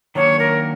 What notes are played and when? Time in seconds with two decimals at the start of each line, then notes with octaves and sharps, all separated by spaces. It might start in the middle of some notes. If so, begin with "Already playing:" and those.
0.15 D#3 F#3 A#3 D4 C#5
0.39 A#4